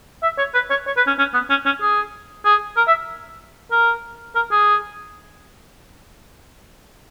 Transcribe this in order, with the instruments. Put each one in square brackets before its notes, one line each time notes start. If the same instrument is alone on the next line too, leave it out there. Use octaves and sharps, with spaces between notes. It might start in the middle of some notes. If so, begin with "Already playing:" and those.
[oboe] E5
C#5
B4
C#5
C#5
B4
C#4
C#4
B3
C#4
C#4
G#4
G#4
A#4
E5
A#4
A#4
G#4